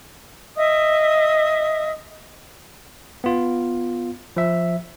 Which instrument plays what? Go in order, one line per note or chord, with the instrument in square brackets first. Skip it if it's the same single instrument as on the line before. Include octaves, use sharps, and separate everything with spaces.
[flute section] D#5 E5 D#6
[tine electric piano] B3 F4
F3 E5